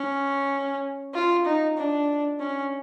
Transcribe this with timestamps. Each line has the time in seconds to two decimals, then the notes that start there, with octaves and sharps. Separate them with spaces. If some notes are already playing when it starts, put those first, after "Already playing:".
Already playing: C#4
1.14 F4
1.45 D#4
1.78 D4
2.40 C#4